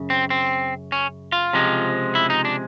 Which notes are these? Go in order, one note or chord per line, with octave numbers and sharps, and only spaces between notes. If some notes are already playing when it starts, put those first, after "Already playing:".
Already playing: F#2 C#3
C4
C4
C#4
F4
C#2 C3 F3 G#3
E4
D#4
D4